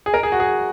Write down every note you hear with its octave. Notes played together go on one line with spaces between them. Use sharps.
G#4
A#4
G#4
F#4
G#4